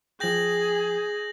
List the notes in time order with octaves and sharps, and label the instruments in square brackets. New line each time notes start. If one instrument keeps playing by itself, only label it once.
[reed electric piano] F3 G5 [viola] G#4 [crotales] G6 A#6 F#7